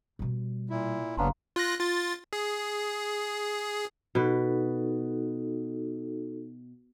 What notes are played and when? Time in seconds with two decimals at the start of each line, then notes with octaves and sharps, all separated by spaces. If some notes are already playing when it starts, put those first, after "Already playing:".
0.19 B2 G3
0.70 A#2 E4
1.17 F#1 B3 C#4 D4 F5 A#5 C6
1.56 F4 F#6 A#6
1.80 F4 A6
2.33 G#4
4.15 B2 D#4 F#4 A4 B4